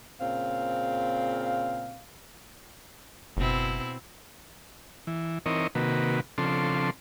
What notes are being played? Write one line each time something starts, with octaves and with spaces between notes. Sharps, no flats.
A#2 C#3 C4 F5
F#1 B2 C4 E4
E3
E3 C4 D#4 A#4 C#5 D#5
C3 D#3 A#3 F#4 B4
C#3 F3 C4 D4 A4 C6